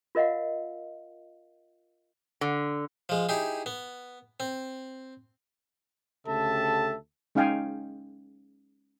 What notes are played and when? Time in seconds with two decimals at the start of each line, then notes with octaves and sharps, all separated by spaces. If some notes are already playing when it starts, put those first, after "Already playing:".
0.15 F4 A#4 D#5 F5 F#5
2.41 D3
3.09 F3 G#3
3.29 D#4 E4 G4 G#4
3.66 B3
4.40 C4
6.27 D2 C#3 G4 A4 E5 A5
7.35 G#3 C#4 D#4 F5 G5 G#5